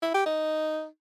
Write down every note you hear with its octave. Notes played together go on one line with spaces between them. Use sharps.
E4
G4
D#4